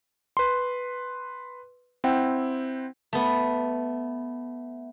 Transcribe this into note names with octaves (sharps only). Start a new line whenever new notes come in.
B4 C6
C4 E4 F#5 G5
A3 B3